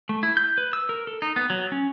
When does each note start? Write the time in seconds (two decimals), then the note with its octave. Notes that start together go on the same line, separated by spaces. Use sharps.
0.09 A3
0.23 E4
0.37 G6
0.58 B4
0.73 E6
0.89 A#4
1.07 A4
1.22 D#4
1.36 B3
1.50 F#3
1.72 C#4